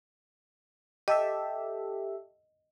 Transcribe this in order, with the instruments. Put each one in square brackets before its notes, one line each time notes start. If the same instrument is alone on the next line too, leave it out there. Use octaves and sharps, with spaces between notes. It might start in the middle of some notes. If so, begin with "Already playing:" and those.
[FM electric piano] G4 A4 E5 [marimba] D#5